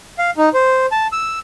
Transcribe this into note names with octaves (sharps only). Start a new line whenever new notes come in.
F5
D#4
C5
A5
E6